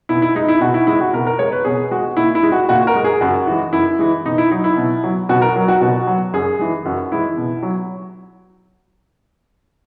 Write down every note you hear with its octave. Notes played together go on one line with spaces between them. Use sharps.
B2 E4
E4
G#3 D#4
E4
B2 F#4
E4
G#3 E4
F#4
B2 A#4
A#4
G#3 C#5
B4
B2 G#4
G#3 F#4
A#2 E4
E4
G#3
F#4
A#2 F#4
A#4
G#3
G#4
F#2 F#4
E3 G#3
F#2 E4
E3 G#3
B2 D#4
E4
F#3 D#4
E4
B2
F#3
B2 F#4
A#4
F#3
F#4
B2 F#4
F#3
F#2 G#4
E3 G#3
F#2 F#4
E3 G#3 E4
B2
F#3